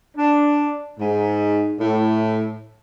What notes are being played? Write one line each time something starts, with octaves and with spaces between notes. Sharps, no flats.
D4
G#2
A2